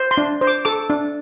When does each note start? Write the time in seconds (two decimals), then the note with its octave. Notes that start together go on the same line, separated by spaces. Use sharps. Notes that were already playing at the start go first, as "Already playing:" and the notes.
Already playing: C5
0.11 C6
0.17 D4
0.41 C5
0.47 D6
0.65 A4 D6
0.90 D4